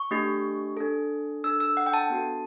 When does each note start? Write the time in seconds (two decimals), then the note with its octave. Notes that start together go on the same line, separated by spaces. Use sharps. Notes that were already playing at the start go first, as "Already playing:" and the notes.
Already playing: C#6
0.11 A3 D4 G4
0.77 D4 A4
1.44 D4 A4 E6
1.60 E6
1.77 F#5
1.86 G5
1.93 A5
2.10 B3 D4 F#4 A4